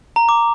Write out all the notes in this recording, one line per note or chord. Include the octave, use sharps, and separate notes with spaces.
A#5
D6